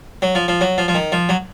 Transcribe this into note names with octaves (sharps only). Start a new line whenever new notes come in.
F#3
F3
F3
F#3
F3
F3
D#3
F3
F#3